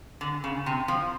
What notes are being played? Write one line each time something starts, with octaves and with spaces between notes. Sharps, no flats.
D3
C#3
C3
F3